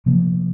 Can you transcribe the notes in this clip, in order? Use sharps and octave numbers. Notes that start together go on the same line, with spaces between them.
C3 F3 A#3